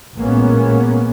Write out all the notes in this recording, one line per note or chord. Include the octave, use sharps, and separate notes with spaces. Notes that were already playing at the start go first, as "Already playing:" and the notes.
A1 A#2 G#3 A#3 B3 C#4